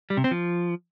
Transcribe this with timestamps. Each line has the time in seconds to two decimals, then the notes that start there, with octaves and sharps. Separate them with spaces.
0.10 G3
0.17 C3
0.24 C4
0.31 F3